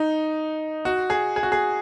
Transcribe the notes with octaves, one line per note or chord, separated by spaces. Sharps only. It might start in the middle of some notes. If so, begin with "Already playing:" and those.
Already playing: D#4
F#4
G#4
G#4
F#4
G#4